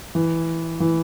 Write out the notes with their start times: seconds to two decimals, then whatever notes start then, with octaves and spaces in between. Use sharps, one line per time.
0.15 E3
0.80 E3